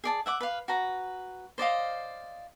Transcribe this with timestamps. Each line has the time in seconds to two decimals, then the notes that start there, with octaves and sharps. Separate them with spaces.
0.04 G#4 D5 A5
0.26 E5 F#5 D6
0.41 B4 F5
0.68 F#4 B4 A#5
1.58 C5 D5 D#5 F5